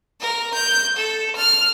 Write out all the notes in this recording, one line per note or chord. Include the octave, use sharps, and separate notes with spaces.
A#4
G6
A4
F6